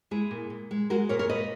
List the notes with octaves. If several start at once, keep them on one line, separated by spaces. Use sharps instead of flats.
G#3 E4 G#4
A#2
A#2
G#3
G#3 F#4 A#4
A#2 A#4 C#5
A#4 C#5
A#2 B4 D#5